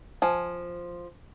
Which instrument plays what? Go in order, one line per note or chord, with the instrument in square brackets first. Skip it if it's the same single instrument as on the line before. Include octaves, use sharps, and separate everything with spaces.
[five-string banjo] F3 G#5